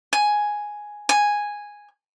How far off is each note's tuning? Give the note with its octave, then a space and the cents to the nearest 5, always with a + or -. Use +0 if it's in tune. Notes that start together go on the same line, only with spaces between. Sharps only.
G#5 +5
G#5 -5